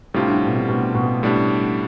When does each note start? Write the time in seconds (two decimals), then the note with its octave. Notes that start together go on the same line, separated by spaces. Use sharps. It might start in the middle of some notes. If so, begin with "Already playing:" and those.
0.14 A2 C3 G3 D4 F4
0.28 D3
0.46 B2
0.55 C3
0.69 B2
0.95 B2
1.23 A2 G3 D4